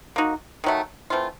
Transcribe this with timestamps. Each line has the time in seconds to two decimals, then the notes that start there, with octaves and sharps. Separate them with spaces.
0.16 A#3 D#4 F#4
0.64 D#3 F#3 A3
1.10 E3 A3 C4 F4